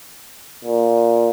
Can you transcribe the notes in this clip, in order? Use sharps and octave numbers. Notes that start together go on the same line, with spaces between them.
A#2